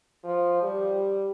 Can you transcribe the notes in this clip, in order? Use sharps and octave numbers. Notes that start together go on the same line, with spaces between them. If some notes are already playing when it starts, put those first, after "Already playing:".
F3
G3